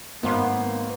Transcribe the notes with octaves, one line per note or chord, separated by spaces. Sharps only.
G#1 A#3 B3 F5 C6